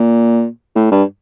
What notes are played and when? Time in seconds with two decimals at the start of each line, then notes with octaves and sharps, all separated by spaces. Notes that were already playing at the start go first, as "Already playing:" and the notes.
Already playing: A#2
0.76 A2
0.92 G2